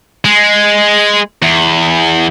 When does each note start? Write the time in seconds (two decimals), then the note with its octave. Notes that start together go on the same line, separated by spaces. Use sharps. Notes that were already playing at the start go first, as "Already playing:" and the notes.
0.25 G#3
1.42 E2